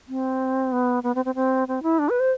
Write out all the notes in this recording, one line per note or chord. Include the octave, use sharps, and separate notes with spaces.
C4
B3
B3
C4
C4
C4
C4
E4
D4
B4
C5